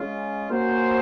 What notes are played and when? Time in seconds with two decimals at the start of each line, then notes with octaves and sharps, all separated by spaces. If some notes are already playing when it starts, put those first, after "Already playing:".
Already playing: G#3 C#4 F4
0.50 A#3 C#4 F#4 C5